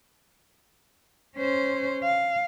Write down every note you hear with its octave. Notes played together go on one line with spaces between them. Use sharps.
C#4 C5
F5